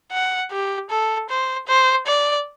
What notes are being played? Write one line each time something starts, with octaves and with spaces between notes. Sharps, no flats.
F#5
G4
A4
C5
C5
D5